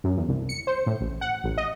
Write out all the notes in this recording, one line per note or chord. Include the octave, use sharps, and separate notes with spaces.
F#2
E2
C2
C#7
C5
A2
A1
F#5
A1
D#5